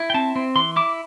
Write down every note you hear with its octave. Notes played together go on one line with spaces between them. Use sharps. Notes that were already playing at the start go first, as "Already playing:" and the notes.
Already playing: E4
G5
C4 A5
C4
E3 C6
E4 D6